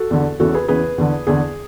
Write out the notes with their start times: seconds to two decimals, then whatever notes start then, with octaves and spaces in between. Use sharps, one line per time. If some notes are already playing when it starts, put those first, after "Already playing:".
Already playing: F#4 A4
0.11 E2 D3
0.40 E2 C#3 E3 F#4 A4
0.54 G#4 B4
0.68 E2 C#3 E3 G#4 B4
0.98 E2 D3
1.27 E2 D3 G#4